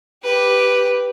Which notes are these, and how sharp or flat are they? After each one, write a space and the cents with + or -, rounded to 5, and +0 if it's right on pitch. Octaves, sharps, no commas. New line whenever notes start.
G4 +0 B4 +0